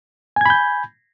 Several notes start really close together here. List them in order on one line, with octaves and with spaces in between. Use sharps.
G#5 G#6 B5 G6